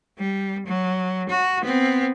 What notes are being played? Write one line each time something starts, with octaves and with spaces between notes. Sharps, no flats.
G3
F#3
F#4
B3 C4